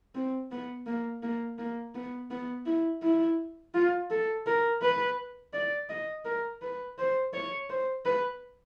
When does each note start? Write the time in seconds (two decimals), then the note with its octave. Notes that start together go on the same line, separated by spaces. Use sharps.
0.15 C4
0.51 B3
0.86 A#3
1.23 A#3
1.58 A#3
1.94 B3
2.31 B3
2.66 E4
3.03 E4
3.74 F4
4.10 A4
4.46 A#4
4.81 B4
5.53 D5
5.89 D#5
6.25 A#4
6.62 B4
6.98 C5
7.33 C#5
7.70 C5
8.05 B4